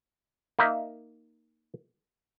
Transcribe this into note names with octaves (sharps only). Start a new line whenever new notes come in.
A#3 D#4 E5